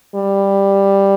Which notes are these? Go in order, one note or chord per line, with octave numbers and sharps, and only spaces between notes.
G3